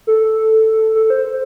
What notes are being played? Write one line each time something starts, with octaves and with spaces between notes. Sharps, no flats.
A4
A4
C5